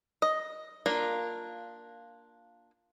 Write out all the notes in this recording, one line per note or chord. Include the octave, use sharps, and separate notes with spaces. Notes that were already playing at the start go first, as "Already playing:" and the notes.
D#5
A#3 D4 F4 A#4